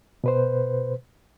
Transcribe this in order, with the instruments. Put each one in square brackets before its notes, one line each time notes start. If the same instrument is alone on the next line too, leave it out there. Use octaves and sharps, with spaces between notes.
[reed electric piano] B2 B4 C5